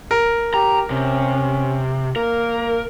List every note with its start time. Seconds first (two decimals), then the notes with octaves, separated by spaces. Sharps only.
0.11 A#4
0.54 G4 A#5
0.90 C3 C#4
2.16 A#3 A#4